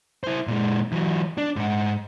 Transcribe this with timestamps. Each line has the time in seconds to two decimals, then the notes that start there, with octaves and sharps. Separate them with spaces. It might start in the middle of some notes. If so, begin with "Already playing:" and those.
0.24 E4 C5
0.47 A#2 G#3
0.92 E3 F#3
1.38 D4
1.56 G#2 F#5